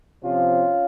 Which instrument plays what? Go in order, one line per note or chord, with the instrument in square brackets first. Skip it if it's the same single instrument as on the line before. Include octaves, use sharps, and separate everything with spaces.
[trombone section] C3 F3 C#4 F4